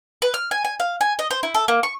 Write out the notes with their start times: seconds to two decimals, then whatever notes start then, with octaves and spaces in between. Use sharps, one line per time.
0.22 B4
0.34 F6
0.51 G#5
0.65 G#5
0.80 F5
1.01 G#5
1.19 D#5
1.31 C5
1.43 E4
1.55 A4
1.68 A#3
1.83 C#6